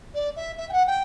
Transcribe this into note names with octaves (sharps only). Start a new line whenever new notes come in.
D5
E5
E5
G5
F#5
G5